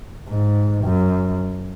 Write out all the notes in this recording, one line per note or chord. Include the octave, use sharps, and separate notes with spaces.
G#2
F#2